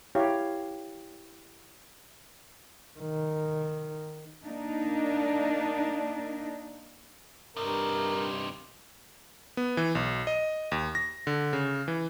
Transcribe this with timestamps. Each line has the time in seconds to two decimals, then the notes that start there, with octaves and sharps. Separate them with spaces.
0.15 E4 G4 C#5 F5
2.99 D#3
4.45 A#3 D4 D#4
7.57 G2 C3 D#4 A#4
9.57 B3
9.77 E3
9.95 B1
10.27 D#5
10.72 D#2
10.95 A#6
11.27 D3
11.53 C#3
11.88 E3